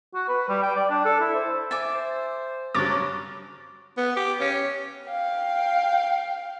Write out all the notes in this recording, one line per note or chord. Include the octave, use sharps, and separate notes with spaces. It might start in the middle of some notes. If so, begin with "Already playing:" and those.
F#4
B4
G3
G5
D5
D4
A4
E4
C5
E5 G#5 D6 A6
C5
G2 C#3 F#3 C#5 D6 A6
B3
G4
C#4
F5 G5